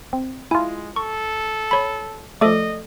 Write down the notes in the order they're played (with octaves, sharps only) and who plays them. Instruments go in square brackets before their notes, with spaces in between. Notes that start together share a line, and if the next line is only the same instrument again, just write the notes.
[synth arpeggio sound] C4
[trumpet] G#3 [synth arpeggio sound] E4 F4 [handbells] G#5
[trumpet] A4 [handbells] C#6
[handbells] C#5 B5
[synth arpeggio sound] F3 A3 [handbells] A4 D5 D6 [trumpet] D#5